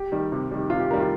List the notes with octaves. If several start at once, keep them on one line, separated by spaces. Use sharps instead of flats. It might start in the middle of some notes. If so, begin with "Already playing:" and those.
Already playing: G4
D#3 G3
C3
D#3 G3
C3 F4
G4
D#3 G3 A#4
F4